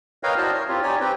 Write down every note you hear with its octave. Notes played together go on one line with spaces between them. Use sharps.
A#4 B4 C#5 D#5 F5 G5
E4 F#4 C5 D5 D#5 A5
A#4 C#5
C4 F4 G4
D#4 G4 C#5 D5 G#5
C4 G4 B4 G5